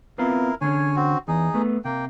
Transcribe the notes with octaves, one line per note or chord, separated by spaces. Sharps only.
B3 C4 E4 F4 A#4
D3 C#4 C#5 G#5
C4 F#4
E2 D#4 G#4
A3 B3
C3 A#3 G5